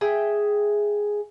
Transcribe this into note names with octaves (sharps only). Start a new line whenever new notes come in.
G#4 E5 G5